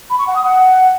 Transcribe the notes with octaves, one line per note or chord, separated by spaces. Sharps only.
B5
C#6
F#5
D#6
F#5